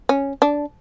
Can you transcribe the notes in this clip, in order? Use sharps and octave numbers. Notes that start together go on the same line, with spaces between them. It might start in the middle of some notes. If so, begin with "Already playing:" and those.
C#4
D4